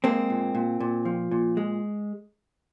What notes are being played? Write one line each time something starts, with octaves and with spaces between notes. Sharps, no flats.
G#3 A#3 C4
A#2
A#2
A#2
F3
A#2
G#3